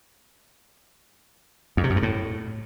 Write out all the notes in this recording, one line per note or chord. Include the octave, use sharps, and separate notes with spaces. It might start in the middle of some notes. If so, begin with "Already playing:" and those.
F2
C3
F#2
G2
A2